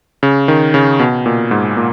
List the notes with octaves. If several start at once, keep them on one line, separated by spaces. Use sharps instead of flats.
C#3
D#3
C#3
B2
A#2
G#2
A#2